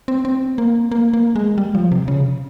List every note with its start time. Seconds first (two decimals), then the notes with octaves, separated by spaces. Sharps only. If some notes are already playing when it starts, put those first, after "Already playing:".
0.08 C4
0.25 C4
0.58 A#3
0.91 A#3
1.13 A#3
1.36 G#3
1.58 G3
1.75 F3
1.92 C3
2.08 C#3